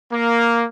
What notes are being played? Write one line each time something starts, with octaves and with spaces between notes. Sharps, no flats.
A#3